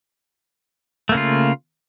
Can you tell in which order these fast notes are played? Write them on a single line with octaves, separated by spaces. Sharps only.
A3 A#3 C#3 F4